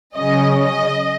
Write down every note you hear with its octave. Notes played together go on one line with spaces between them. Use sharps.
C#3 F#3 C#4 D#5
D#5